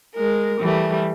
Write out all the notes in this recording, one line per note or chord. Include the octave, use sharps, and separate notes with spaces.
G#3 A#4
E3 G3 A3